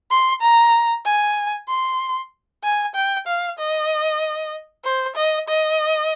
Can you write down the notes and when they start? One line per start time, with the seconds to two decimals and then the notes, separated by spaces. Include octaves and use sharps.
0.11 C6
0.42 A#5
1.05 G#5
1.68 C6
2.63 G#5
2.95 G5
3.27 F5
3.58 D#5
4.84 C5
5.16 D#5
5.48 D#5